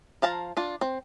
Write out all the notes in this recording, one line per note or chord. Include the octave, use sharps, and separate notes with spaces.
F3 F5 A5 A#5
D4 F4
C4